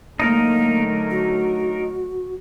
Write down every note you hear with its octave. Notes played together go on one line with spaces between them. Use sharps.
D3 F#3 A3 A#3 D#4 A#4
F#4